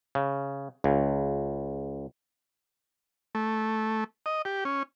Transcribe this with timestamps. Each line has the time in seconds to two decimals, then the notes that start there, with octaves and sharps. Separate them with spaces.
0.15 C#3
0.84 C#2
3.35 A3
4.26 D#5
4.45 G4
4.65 C#4